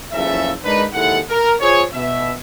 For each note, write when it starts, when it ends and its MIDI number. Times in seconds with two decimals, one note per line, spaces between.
0.12 0.51 30
0.12 0.51 40
0.12 0.51 49
0.12 0.51 53
0.12 0.51 69
0.12 0.51 76
0.64 0.84 56
0.64 0.84 62
0.64 0.84 63
0.64 0.84 70
0.64 0.84 71
0.93 1.18 39
0.93 1.18 56
0.93 1.18 64
0.93 1.18 69
0.93 1.18 78
1.30 1.53 70
1.60 1.82 65
1.60 1.82 68
1.60 1.82 72
1.60 1.82 73
1.93 2.32 47
1.93 2.32 76